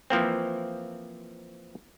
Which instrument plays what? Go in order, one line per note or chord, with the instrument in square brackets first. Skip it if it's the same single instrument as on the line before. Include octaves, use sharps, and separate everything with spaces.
[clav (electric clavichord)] E3 F3 A#3 C4